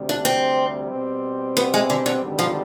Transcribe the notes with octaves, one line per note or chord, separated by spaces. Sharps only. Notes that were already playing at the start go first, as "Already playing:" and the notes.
Already playing: D2 C3 G3
D4
C4
B2 G3 C4
B3
G#3
D3
D3
G#1 G2 D3 G3
F3